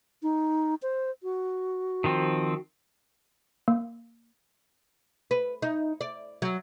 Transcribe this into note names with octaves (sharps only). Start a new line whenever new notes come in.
D#4
C5
F#4
D#3 F3 C4
A#3
B4
D#4
D5
F#3